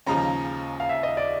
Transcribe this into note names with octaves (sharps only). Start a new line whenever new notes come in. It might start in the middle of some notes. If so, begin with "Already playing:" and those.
D#2 C#3 F3 G#3 C#4 A#5
F5
E5
D#5
D5